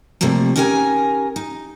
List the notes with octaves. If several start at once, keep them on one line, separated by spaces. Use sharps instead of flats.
C3 F3 G3 A3 A#3
C#4 D#4 G4 A#4 F#5 G#5
D#4